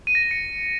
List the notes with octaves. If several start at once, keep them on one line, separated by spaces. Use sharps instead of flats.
D#7
A#6
D#7
C#7